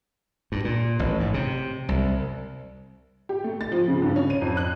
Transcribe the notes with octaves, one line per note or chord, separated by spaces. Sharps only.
G2
A#2
A1
G#2
C3
C2
G4
A3
A6
F3
C#3
G2
C#4
D#7
F2
F#6